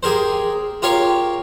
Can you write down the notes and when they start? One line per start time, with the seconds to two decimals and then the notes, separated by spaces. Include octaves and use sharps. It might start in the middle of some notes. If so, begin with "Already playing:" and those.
0.03 G4 G#4 A#4 C5
0.82 F4 G4 A#4 C#5 F5